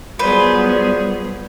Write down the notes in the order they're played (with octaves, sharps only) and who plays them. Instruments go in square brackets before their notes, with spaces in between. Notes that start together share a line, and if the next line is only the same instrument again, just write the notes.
[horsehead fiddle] F#3 G#4 [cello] G3 B3 [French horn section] F4 D5 [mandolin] B4 C5